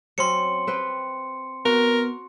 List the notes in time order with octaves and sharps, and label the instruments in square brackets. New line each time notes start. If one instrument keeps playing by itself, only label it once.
[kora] F#3 C4 C#4 [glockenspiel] C6 C#7
[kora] C4 B4 G5
[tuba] B3 [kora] F#4 [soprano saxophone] A#4